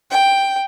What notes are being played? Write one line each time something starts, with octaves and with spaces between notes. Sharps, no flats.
G5